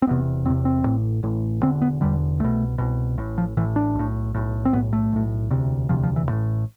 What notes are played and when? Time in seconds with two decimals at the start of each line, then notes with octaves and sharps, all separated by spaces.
0.02 C4
0.07 E1 E2 C3 B3
0.45 E1 E2 C3 C4
0.65 C4
0.84 A1 A2
1.23 A1 A2
1.62 E1 E2 D3 C4
1.82 B3
2.01 E1 E2 D3 G3
2.40 C2 B2 A3
2.78 C2 B2
3.18 A1 A2
3.38 F3
3.57 A1 A2 E3
3.76 D4
3.95 B1 A2
4.35 B1 A2
4.65 C4
4.73 B1 A2 B3
4.93 A3
5.12 B1 A2
5.51 E1 D2 C3
5.89 E1 D2 C3 F3
6.03 F3
6.16 E3
6.29 A1 A2